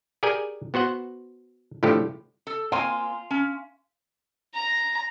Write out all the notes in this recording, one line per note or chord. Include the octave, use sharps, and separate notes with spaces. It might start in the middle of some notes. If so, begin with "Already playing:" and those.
G4 G#4 A#4 D5 G5 G#5
B3 F#4 C5 F#5
A2 D3 F3 A3 G4
A4
A#3 C4 F5 G#5 C6
C#4
A#5